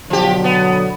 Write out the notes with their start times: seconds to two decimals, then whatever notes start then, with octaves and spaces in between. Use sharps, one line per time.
0.10 B2 D3 F3 F#3 G4
0.44 B3